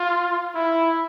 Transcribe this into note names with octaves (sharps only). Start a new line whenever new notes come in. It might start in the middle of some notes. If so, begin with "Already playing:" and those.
Already playing: F4
E4